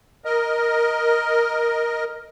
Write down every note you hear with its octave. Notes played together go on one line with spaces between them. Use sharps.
A#4 D#5